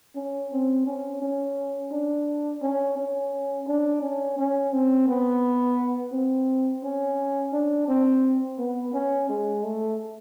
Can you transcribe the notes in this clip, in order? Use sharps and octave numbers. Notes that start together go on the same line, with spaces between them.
C#4
C4
C#4
C#4
D4
C#4
C#4
D4
C#4
C#4
C4
B3
C4
C#4
D4
C4
B3
C#4
G#3
A3